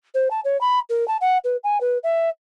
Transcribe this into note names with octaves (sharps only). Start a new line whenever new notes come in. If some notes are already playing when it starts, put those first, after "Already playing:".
C5
A5
C#5
B5
A#4
A5
F#5
B4
G#5
B4
E5